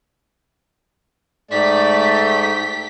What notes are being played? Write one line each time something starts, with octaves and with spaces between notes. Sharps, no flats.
G#2 A3 G4 D5 B6